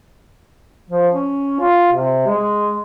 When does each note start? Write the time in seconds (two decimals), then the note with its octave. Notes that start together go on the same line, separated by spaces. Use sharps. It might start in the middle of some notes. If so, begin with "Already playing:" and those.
0.90 F3
1.13 C#4
1.60 F4
1.93 C3
2.27 G#3